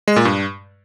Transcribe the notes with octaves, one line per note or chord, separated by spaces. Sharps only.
G#3
A#2
G2